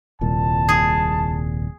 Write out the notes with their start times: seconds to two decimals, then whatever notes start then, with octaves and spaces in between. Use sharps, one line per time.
0.21 D#1 C2 A#2 A5
0.69 G#4